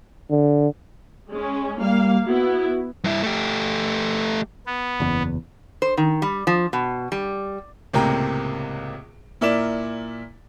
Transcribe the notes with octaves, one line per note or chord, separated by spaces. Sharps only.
D3
G#3 C#4
G3 A#3 F5
B3 E4 F#4
G2 E4
A3 G4
B3
F#1 E2
C5
D#3
G3
F3
B2
G3
C#2 A2 C3 A#3 G5 A#5
A#2 E4 A#4 D5 E7